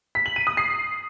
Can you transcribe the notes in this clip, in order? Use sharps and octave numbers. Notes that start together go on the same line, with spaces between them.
B6
F#7
D#7
D#6
C7